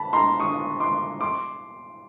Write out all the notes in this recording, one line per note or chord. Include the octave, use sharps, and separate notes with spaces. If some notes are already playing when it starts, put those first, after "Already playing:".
Already playing: A5 B5
A#5 C6
C#6 D#6
C6 D6
C6 D6